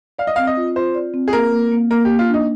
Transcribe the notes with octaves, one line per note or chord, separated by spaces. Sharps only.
D5 F5
D#5
C4 F5
D#5
F4
F4 C5
D5
C4
G#4
A#3 A#4
A#3
A#3
A#3 A#4
G4
A#3
F4
D4 D#4